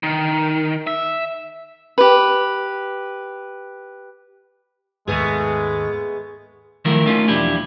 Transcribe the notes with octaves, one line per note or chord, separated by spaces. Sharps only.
D#3
E5
G4 B4
D#2 G#2 G#3 A3 B3 G#4
D#3 F3 F#3 A3 E4 A#4
A3 A#3 C#4 D#4 F4
B1 E2 F3 D4 E4 G4